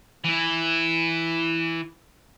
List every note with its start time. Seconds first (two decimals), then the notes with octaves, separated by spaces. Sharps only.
0.24 E3 E4